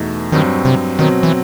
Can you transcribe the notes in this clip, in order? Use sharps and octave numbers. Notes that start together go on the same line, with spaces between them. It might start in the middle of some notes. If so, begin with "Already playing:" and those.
Already playing: E2 B2 A3 D#4
G2 D#3 F#3 C4
C3
B2 D#3 F#3 C4
E3